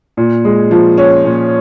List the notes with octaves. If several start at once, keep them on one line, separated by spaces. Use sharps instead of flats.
A#2
G#3
F3
C#4
A#2